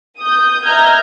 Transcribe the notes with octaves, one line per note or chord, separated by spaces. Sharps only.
D#6 G6
D#5 E5 A#5 F6 G6 G#6